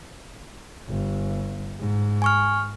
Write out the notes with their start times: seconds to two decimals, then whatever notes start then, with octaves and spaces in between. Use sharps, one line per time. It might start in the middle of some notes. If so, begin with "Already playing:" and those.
0.89 G1
1.79 G#2
2.22 G#5 C#6 F6